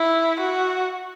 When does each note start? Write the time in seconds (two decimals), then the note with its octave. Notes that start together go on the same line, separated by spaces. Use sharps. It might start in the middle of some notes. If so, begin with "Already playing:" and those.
Already playing: E4
0.40 F#4